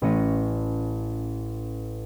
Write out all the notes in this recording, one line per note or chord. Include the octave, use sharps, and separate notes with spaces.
A1 A3 C#4 A#6 C#7 D#7